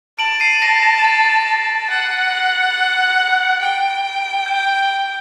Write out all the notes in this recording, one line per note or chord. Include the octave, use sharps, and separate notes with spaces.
A5 D7 F#7
C7 D#7
A#6 D7
A#6
A6
F#5
G5
G6